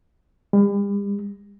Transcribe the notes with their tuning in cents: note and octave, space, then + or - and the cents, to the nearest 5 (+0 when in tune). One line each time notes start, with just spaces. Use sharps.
G3 +45